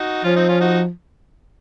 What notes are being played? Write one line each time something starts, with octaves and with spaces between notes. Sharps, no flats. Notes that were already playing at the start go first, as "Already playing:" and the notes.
Already playing: D#4 F#4
F3 C#4 F4
C4 D#4
C#4 F4
D#4 F#4